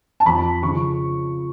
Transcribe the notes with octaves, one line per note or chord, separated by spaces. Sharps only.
A5
F2 F3 B5
C#3 F3 C#6